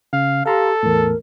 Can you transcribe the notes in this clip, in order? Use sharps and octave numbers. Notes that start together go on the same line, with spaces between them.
C#3 F5
G4 A4 F5 A#5 C6
E2 A2 A#4